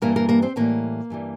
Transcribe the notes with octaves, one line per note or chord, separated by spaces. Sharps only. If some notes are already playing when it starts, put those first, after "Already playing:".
G2 E3 G3 A#3 A#4
A#3 A#4
A#3 A#4
C4 C5
A2 E3 G3 A#3 A#4
G2 E3 G3